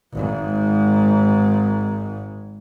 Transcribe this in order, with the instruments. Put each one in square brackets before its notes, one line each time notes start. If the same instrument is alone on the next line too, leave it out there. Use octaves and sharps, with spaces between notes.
[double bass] G#1 G#2